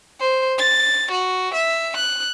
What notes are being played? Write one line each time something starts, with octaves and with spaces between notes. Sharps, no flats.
C5
A6
F#4
E5
F#6